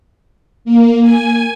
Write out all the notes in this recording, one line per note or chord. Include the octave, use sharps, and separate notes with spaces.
A#3
G#5